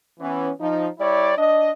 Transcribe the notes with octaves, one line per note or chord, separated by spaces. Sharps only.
E3 B3 C#4
F3 D#4
G3 E4 C#5 D5
D4 D#5